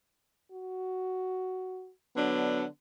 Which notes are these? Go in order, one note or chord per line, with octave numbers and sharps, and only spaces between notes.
F#4
D3 F#3 B3 D4